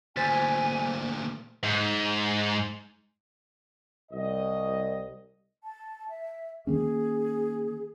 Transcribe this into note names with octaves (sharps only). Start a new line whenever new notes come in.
D2 A#2 C5 G#5 A6 B6
G#2
C2 D#5
A5
E5
D#3 A#3 C#4 G#4